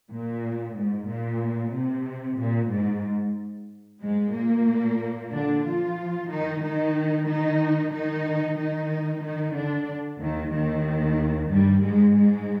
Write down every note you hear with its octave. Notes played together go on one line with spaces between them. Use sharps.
A#2
G#2
A#2
C3
A#2
G#2
G#2 G#3
A#2 A#3
D3 D4
F3 F4
D#3 D#4
D#3 D#4
D#3 D#4
D#3 D#4
D#3 D#4
D#3 D#4
D3 D4
D#2 D#3
D#2 D#3
G2 G3
G#2 G#3
G#2 G#3